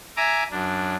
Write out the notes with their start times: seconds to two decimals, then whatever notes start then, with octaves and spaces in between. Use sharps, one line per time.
0.17 E5 G#5 A#5 D6
0.51 F#2 D4